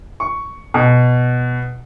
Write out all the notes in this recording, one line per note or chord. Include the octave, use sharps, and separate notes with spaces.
C#6
B2